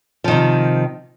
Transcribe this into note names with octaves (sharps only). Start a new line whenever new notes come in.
C3 D#3 F3